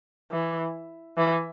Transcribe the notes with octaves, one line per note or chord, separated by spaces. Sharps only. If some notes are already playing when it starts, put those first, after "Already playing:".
E3
E3